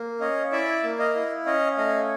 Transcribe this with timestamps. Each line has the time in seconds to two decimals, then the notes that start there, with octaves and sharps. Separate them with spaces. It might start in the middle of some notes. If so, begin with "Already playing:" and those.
Already playing: A#3
0.20 C#4 D#5 F5
0.52 E4 D5 E5
0.83 A#3
0.99 D#5 F5
1.15 E4
1.46 C#4 D#5 F5
1.77 A3 D#5 F5